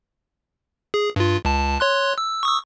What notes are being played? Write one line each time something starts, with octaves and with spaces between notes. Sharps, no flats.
G#4
G2 F4
C#2 A5
C#5 C6 F#6
E6
C#6 D#6 E6